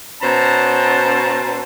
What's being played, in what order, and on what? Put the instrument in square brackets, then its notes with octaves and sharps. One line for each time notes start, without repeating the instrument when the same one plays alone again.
[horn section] B2 C#4 C5 A5 A#5